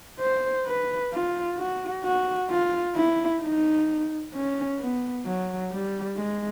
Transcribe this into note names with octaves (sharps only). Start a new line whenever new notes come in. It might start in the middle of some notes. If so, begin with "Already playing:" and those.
C5
B4
F4
F#4
F#4
F4
E4
D#4
C#4
B3
F#3
G3
G#3